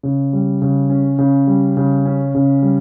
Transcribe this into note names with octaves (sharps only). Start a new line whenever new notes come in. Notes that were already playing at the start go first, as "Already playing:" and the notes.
C#3
G3
C#3
C#4
C#3
G3
C#3
C#4
C#3
G3